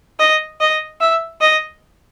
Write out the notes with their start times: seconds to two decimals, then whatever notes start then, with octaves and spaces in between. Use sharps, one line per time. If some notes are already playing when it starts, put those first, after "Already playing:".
0.19 D#5
0.60 D#5
1.01 E5
1.41 D#5